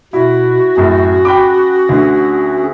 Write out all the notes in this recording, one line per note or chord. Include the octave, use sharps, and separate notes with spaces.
B2 E4 F#4
F#2 A2 C#4 G#4
G5 B5 D6
D2 D3